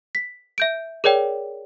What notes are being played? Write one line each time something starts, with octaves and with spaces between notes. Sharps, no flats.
B6
E5 G6 D7
G#4 A#4 C#5 D5 G5